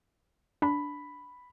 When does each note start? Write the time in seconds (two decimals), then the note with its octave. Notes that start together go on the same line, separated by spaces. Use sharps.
0.62 D4 B5